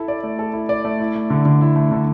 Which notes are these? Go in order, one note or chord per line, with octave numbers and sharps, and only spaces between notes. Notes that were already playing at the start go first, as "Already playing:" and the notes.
Already playing: E4 A4
D5
A3
A4
E4
D5
A3
E4
A3
D3
D3
E4
A3
D3